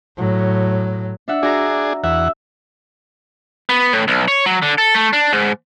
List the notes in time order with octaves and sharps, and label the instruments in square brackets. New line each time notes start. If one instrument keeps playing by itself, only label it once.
[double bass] A2 F#3
[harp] D4 E5 F#5
[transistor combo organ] D4 G#4 [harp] F#4 A#5
[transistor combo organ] E2 F#5 [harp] E5
[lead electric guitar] B3
A2
B1
C#5
F#3
D3
A4
A3
D4
G#2